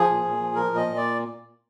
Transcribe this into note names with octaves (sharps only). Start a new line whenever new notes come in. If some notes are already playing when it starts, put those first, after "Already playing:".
Already playing: F3 G#4
A#2
A#2
F3
F3 A#4
A#2
D#5
A#2
D5